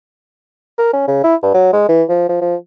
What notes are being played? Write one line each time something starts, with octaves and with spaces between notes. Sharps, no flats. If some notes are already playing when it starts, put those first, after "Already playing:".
A#4
C#4
C#3
E4
G2
F#3
G#3
E3
F3
F3
F3